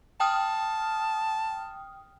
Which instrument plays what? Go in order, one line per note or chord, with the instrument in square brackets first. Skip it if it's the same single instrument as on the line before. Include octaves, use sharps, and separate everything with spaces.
[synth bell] G5 D#6 F6 [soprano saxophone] A5